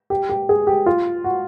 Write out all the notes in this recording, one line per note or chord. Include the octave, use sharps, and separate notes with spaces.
G4
G4
G#4
G4
F4
F#4